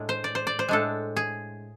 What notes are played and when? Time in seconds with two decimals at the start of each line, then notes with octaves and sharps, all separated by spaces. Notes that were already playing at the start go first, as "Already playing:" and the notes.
Already playing: A2 G#3 D4
0.09 C5
0.24 D5
0.35 C5
0.47 D5
0.59 C5
0.69 A2 G#3 D4 A4
1.16 G#4